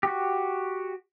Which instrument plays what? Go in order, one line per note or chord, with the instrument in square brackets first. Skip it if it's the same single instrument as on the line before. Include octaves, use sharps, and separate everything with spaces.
[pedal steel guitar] F#4 G4